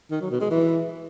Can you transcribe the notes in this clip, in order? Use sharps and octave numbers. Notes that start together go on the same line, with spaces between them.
D#3
F#3
B2
G#3
E3